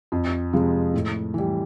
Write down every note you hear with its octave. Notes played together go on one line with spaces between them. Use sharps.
F2
C3 F3 G#3
A2
E3 G3